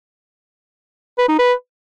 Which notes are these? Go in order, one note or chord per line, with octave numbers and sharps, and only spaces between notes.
B4
D#4
B4